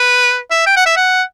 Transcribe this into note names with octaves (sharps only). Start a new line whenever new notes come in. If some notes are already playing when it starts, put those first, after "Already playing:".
Already playing: B4
E5
G5
F#5
E5
F#5